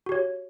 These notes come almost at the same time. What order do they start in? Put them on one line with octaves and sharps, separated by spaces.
F#4 G4 C#5